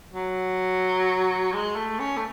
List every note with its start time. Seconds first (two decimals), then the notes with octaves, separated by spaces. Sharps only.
0.13 F#3
1.53 G#3
1.76 A3
1.99 C#4
2.17 A3